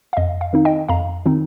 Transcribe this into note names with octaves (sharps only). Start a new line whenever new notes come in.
F5
F2 D#5
F5
D#3 C4 D#4
D#5 G5
F2 F5 A#5
D#3 C4 D#4